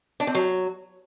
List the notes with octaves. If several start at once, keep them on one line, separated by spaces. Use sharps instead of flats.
D4
C4
F#3